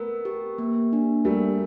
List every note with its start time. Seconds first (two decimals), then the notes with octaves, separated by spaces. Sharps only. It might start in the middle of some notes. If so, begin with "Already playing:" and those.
Already playing: A3 B3 A#4
0.25 G4
0.58 A#3
0.93 D4
1.25 G3 A3 A#4